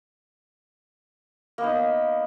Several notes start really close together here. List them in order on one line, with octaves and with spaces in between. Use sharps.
A#3 B3 D#4